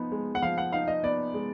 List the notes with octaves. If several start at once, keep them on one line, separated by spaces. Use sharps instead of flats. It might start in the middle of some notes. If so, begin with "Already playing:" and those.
Already playing: F3 B3 D#4
G#3
F#5
F3 F5
F#5
D#4 F5
D#5
B3 D5
G#3